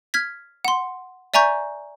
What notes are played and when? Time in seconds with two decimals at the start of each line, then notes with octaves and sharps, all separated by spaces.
0.14 F6 G#6 B6
0.65 F#5 C6
1.34 D5 E5 G#5 A#5 C#6 G6